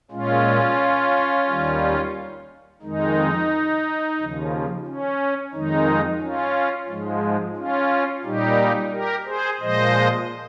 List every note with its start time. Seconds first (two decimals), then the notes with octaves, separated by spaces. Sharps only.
0.11 A#2 G#3 C#4 F4
1.47 D#2 D#3 G3
2.82 F2 D#3 G#3 D#4
4.18 D#2 C#3 F3
4.86 C#4
5.53 F2 D#3 G#3 D#4
6.21 C#4 F4
6.89 G#2 F3 G#3
7.56 C#4 F4
8.24 A#2 G3 D#4 G4
8.92 G4 A#4
9.26 G#4 C5
9.60 A#2 F3 G#3 C5 D#5